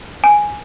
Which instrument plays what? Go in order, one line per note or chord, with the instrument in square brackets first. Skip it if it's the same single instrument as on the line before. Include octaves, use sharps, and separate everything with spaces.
[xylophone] G#5